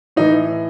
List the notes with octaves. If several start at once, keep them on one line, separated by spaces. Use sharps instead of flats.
A2 E3 D#4